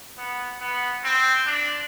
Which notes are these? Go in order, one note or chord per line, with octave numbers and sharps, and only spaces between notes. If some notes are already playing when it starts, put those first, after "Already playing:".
B3
B3
C4
D4